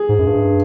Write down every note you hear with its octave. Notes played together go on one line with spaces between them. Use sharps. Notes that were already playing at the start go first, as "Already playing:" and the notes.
Already playing: G#4
G#2
F#2
G2